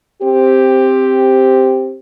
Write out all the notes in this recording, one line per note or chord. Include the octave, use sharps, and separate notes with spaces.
C4 G4